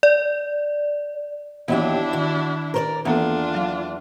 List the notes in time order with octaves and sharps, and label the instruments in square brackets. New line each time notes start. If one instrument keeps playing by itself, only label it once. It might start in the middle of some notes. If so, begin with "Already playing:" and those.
[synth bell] D5
[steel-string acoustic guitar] D#2 F#3 G4 [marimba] E3 B3 [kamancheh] D4 E4
[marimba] D#3 [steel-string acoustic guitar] F#4
[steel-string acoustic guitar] A#4 C5 D5
[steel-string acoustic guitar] E2 [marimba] E3 A#3 A4 [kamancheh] D4 F4
[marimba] F#3 F5